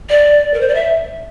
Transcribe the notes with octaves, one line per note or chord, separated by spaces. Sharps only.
D5
A#4
C5
D5
E5